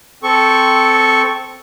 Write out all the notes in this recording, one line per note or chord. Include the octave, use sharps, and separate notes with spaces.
C4 A4 C#6